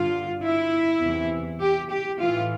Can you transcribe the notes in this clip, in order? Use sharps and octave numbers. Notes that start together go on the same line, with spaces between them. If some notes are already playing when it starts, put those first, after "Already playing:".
Already playing: G2 D3 F4
E4
E2 C3 E3
G4
G4
A2 E3 F4